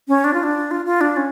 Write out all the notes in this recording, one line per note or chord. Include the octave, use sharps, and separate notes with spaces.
C#4
D4
F4
D4
F4
F4
D4
C#4